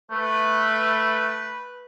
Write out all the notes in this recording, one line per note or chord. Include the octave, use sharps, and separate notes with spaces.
A3 B4